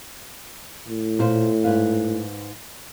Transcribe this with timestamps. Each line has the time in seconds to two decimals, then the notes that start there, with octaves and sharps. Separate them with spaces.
0.88 A2
1.19 A#2 C5
1.64 G#2 B4 F5